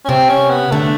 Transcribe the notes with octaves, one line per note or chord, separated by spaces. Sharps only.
C#4
C3 C4
C#4
B3
D3 A3